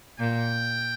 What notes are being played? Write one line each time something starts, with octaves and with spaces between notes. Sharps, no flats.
A#2 G5